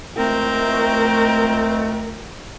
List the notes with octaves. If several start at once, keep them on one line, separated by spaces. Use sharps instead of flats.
C#2 A3 C4 A#4